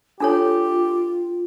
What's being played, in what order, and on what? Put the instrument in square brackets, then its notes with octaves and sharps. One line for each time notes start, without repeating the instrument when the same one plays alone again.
[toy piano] D4 A4 C#5 [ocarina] F4 [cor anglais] G4